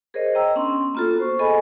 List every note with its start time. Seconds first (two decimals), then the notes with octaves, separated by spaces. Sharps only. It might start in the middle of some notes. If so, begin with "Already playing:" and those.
0.14 G#4 A#4 C5 C#5 D#5
0.35 D#5 G5 A#5 E6
0.55 B3 C#4 D4 C6
0.95 A#3 B3 F4 F#4 A4
1.19 C5 C#6
1.39 G#4 A4 D#5 G#5 B5